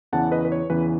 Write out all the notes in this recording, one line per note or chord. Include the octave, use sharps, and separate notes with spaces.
E2 C#3 E3 F#5 A5
B4 D#5
B4
C#5
E2 C#3 E3 B4